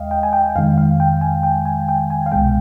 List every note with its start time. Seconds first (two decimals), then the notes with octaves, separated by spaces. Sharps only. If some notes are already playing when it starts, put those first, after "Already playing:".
Already playing: D#2 G#3 D#5 F5 G5
0.11 G5
0.23 G#5
0.33 G5
0.56 F2 D#3 G#3 F5
0.78 F5
1.00 G5
1.21 G#5
1.43 G5
1.65 G#5
1.89 G5
2.10 G#5
2.26 F5
2.32 C2 B2 G#3 G5